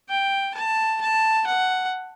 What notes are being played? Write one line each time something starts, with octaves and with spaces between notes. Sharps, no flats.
G5
A5
A5
F#5